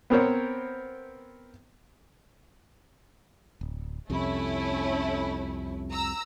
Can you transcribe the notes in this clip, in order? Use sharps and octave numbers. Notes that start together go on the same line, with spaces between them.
B3 C4 A#4 C5 C#5
D1
C2 F2 C3 A3 C#4 E4
A#5 E6